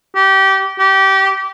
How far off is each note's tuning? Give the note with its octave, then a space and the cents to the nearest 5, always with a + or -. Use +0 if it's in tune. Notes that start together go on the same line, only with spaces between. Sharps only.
G4 -25
G4 -25